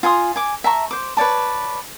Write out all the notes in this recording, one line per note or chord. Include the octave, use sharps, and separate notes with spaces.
F4 G#5 C6 D#6
G#5 D6
E5 A5 A#5 C#6
C5 D6
B4 C#5 D5 A5